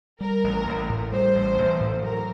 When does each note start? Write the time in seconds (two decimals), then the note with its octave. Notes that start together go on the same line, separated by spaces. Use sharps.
0.21 G3 A#4
0.44 A1
0.67 A1
0.89 A2
1.12 G3 C5
1.35 A1
1.58 A1
1.80 A2
2.03 F#3 A#4